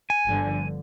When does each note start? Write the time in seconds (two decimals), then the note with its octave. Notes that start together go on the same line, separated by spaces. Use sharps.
0.10 G#5
0.27 G1 G2 D3 F3